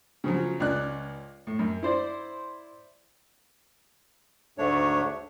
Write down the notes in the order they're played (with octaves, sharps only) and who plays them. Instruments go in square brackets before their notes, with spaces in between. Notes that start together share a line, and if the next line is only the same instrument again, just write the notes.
[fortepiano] C#3 F3 F#3
C#2 C#4 D#4 D5 F#6
A2
F#2
E4 C5 D5
[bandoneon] D2 G#2 A3 D4 C#5